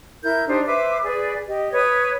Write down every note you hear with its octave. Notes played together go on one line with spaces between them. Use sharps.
E4 A#4 G6
D4 D#4 G4 C5
B4 C5 E5 D6
G#4 B4 D5
G4 D#5
B4 C#5 D#6